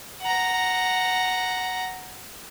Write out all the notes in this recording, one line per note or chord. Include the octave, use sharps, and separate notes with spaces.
F#5 A#5